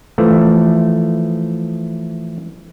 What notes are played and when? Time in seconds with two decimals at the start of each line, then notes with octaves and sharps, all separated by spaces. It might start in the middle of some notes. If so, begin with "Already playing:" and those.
0.18 E3 F3 A3